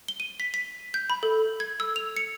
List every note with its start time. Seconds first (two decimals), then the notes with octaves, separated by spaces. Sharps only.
0.08 G7
0.20 D#7
0.40 B6
0.54 B6
0.94 G6
1.10 B5
1.23 A4
1.60 G#6
1.80 E6
1.96 F7
2.17 C#7